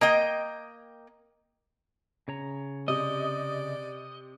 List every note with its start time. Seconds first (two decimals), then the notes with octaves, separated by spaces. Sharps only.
0.01 A#3 D#5 G5
2.28 C#3 C#5 A#5
2.88 C3 D5 D#5